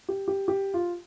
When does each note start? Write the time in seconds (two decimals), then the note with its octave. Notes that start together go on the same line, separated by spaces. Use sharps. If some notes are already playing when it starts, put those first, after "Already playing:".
0.09 G4
0.28 G4
0.48 G4
0.74 F4